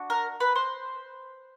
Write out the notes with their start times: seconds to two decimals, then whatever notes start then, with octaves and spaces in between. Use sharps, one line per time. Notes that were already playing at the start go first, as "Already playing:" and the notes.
Already playing: D4 F#4
0.10 A#4
0.40 B4
0.56 C5